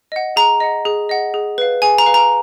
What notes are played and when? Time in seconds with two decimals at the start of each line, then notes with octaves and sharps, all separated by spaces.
0.12 D#5 F#5
0.36 G#4 A#5
0.60 D#5 F#5
0.85 G#4
1.09 D#5 F#5
1.34 G#4
1.58 B4 F5
1.82 G#4 G#5
1.98 A#5
2.06 B4 F5
2.14 A#5